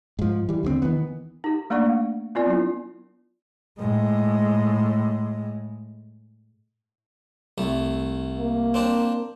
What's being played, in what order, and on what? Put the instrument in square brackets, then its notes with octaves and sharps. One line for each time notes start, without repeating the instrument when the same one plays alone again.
[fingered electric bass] G#2 F3
E3 G3
D#2 D3 G#3 C4
D#3 E3 B3
[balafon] D#4 G4
A3 A#3 D4 D5 F#5 C#6
F5
B3 C4 F4 A#4 D5 G#5
F#3 B3 D4 E4 F4
[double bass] A2 G#3
[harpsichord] C2 A3
[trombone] A#3
[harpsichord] C4 D4 C5